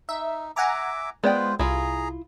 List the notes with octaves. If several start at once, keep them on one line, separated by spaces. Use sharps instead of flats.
D#4 E5
E5 F#5 G#5 A#5 D6
G#3 B3 F4 C5 D5 G5
C2 E4 F4 G#4 A#5